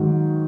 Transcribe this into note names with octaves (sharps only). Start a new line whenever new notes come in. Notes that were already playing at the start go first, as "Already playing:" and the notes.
Already playing: G#2 D#3 F#3